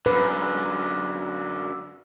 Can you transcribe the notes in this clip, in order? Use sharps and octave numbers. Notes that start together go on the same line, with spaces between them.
F#2 D3 B4